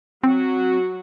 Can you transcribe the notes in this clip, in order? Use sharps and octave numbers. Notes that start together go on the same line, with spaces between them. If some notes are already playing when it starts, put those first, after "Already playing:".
F#3 C4 F#4